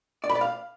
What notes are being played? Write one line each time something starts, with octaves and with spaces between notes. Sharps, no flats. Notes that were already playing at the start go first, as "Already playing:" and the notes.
D5
B5
D5
F5